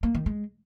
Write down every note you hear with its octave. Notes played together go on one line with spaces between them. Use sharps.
A#3
D#3
G#3